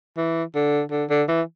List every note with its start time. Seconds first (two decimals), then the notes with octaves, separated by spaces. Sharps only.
0.17 E3
0.55 D3
0.91 D3
1.10 D3
1.28 E3